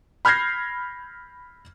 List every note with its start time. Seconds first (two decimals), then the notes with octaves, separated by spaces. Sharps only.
0.25 B5 F6 G6 G#6 A#6 C7